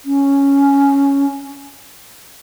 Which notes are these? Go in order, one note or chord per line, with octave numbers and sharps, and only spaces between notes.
C#4